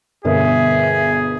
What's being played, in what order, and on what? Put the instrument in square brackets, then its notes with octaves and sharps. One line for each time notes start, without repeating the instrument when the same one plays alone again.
[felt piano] G1 B2 A#4 [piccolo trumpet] G#4 [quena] E5